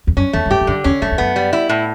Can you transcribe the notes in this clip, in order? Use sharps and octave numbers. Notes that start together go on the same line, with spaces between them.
E2
F#2 C#4
E2 A3
G2
F#2 G4
G2
F#2 D3
E2 C#4
F#2 A3
E2
F#2 B3
G3
E4
A2